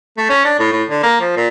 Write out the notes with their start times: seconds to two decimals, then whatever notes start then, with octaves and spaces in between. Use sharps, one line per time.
0.17 A3
0.29 C#4
0.44 D4
0.59 A2
0.72 A2
0.89 D3
1.03 A#3
1.20 F3
1.36 A#2